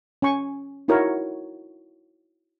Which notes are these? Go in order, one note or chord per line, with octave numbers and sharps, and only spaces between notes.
C#4 G#5 C#6
D#4 E4 F#4 A#4 C#5